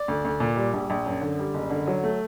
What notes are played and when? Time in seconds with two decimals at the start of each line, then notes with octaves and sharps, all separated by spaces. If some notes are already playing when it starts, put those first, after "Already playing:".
Already playing: D5
0.08 D2
0.25 D2
0.40 A#2
0.56 G3
0.74 A#1
0.90 A#1
1.06 F#2
1.21 D3
1.39 G3
1.54 F#1
1.70 D3
1.87 F#3
2.04 A3